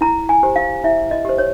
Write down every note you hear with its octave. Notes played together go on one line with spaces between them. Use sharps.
E4 A#5
G#5
G4 C5
F5
E4 E5
D#5
G4 C5
C#5